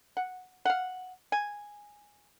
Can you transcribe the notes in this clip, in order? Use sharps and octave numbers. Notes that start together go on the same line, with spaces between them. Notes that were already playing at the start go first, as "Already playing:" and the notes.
F#5
F5 F#5
G#5